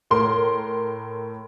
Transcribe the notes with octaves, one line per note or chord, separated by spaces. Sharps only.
A2 A#4 C6